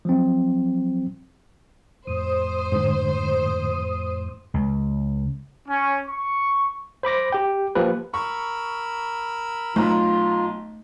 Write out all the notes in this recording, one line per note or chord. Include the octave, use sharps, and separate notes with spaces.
F3 F#3 C4
F2 A2 C5 D#6
G#2 D3
C#2
C#4
C#6
C5 B5 D6 A#6
G4 G5
F3 A#3 G4 B4
A#4 B5 C#6 E6
B1 A3 F4 A#5